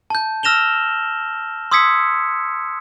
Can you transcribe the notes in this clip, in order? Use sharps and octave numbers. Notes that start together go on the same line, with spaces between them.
A5 G6
E6 F6 A#6 E7 F7 G7
C6 D#6 E6 G#6 B6 C#7